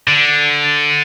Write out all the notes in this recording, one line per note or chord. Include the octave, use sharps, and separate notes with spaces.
D3